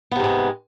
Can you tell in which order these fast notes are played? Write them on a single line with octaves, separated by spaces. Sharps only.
B3 C3 G#2 G#3